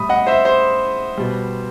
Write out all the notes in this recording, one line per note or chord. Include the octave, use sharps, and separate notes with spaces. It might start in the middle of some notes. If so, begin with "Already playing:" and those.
Already playing: A2 G3 B5 D#6
D#5 F#5
C5 E5
C5
B2 G3